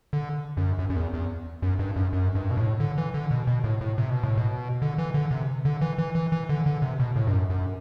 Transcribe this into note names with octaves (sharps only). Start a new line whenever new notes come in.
D3
F#2
F#2
F#2
E2
E2
F#2
G2
F#2
F#2
G2
B2
A2
D3
E3
D3
B2
B2
A2
A2
C3
B2
A2
B2
D3
E3
D3
C3
D3
E3
E3
E3
E3
D3
D3
C3
B2
A2
G2
F#2
F#2